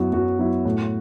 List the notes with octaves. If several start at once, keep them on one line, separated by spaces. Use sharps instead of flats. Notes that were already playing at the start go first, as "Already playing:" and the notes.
Already playing: F#2 F#3 B3 E4 F#4
F#2 F#4
F#3 B3 E4
A2